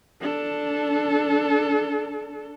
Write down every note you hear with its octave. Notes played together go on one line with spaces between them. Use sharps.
D4 A4